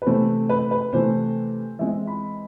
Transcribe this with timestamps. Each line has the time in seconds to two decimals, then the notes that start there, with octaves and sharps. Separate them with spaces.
0.02 B4
0.06 C3 E3 A3 C4 C5
0.49 B4
0.71 B4
0.93 C3 E3 A3 C5
1.79 E3 G#3 C4 E5
2.07 B5